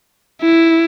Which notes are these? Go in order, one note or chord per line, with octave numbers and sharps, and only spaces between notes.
E4